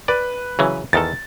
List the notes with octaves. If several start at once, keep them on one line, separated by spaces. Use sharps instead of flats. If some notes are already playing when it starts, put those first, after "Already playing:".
B4 D5
C#3 E3 F#3
E2 D#3 A4 A6